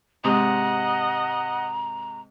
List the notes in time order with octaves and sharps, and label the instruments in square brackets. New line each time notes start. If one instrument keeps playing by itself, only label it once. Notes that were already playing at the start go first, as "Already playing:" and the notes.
[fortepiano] G#2 C3 D#6 [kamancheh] D#5 F#5 [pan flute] A#5